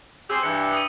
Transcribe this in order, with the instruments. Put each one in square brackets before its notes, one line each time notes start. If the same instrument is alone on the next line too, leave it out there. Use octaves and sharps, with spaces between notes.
[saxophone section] C4 G4 G#4 [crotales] E6
[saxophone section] G2 E3 [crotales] C#7
[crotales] D#6 D#7